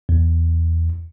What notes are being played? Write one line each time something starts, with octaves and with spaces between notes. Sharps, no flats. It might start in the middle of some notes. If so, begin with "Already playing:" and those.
E2